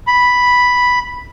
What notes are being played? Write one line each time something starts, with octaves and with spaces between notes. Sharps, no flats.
B5